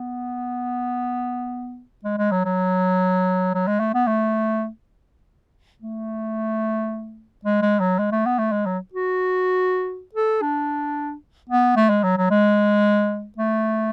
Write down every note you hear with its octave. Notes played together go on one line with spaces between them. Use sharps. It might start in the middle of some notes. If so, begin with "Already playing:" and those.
Already playing: B3
G#3
G#3
F#3
F#3
F#3
G#3
A3
B3
A3
A3
G#3
G#3
F#3
G#3
A3
B3
A3
G#3
F#3
F#4
A4
D4
B3
A3
G#3
F#3
F#3
G#3
A3